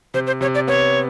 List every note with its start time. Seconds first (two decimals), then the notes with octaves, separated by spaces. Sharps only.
0.14 C3 C5
0.27 C5
0.41 C3 C#5
0.55 D5
0.68 B3 C#5